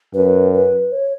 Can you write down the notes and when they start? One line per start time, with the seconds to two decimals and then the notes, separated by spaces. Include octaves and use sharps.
0.14 F#2 B4
0.53 B4
0.92 C#5